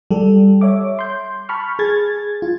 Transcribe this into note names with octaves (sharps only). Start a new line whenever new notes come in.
G3 G4 A4
C#5 E5 D6
C6 G6
A5 B5 C#6 F6
G#4 G#6 A6
F4